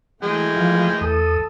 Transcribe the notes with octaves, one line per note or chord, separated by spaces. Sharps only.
E3 G#3 A3 G5
F3 F5
E2 A4 D#6